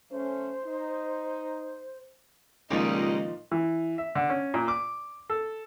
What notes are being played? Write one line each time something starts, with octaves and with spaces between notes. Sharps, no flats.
F#3 A3 C#4 C5
D#4
C#2 A#2 D#3 F3 G3 D#4 D#5
E3
E5
D3
C#4
A#2
D6
A4